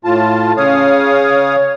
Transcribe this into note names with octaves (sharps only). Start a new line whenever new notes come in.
A2 F4 A5
C#3 C#5 F5 D#6